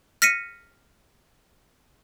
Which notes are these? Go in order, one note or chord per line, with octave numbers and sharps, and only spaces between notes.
F6 A#6 B6 C#7 D#7